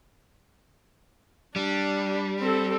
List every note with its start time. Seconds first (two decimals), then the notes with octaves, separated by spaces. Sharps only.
1.56 G3 D4
2.39 C4 A4